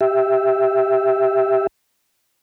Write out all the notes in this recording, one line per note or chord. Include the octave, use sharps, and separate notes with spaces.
G4 E5